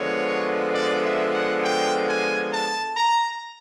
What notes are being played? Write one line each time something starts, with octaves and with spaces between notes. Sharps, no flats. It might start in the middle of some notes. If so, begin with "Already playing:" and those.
Already playing: D3 F3 G#3 B3 C#5
D5
E5
F#5
G5
G#5
A5
A#5